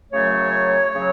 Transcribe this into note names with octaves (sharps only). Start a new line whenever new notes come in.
F#2 C#3 F#3 A3 C#5
C#3 F#3